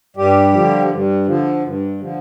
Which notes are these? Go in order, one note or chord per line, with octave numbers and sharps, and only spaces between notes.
G2 G3 G4
D3 F3
G2
D3 F3
G2
D3 F3